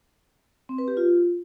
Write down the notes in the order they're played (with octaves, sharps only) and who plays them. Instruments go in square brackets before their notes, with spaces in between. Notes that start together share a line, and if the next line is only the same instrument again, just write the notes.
[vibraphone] C4
B4
G4
F4